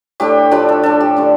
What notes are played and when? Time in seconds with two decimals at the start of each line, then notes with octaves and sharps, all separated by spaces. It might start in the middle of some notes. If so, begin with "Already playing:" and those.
0.20 A2 A3 D4 G4
0.51 A2 F3 D4 G4
0.69 A4
0.83 F3 D4 A4
1.01 G4
1.16 D3 A3 D4